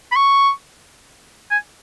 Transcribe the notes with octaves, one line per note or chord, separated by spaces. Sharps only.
B5
C#6
G#5